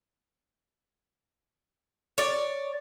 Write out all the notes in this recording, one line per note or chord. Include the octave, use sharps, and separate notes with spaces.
C#5 D5